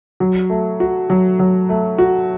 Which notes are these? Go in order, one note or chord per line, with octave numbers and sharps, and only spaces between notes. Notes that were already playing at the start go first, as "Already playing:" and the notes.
F#3
A3
F#4
F#3
F#3
A3
F#4